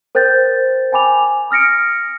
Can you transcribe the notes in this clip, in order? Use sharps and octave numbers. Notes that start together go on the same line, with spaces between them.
A#4 C5 G5 G6 A6
G5 G#5 B5 D6 F7
D#6 F6 A#6 C#7 D7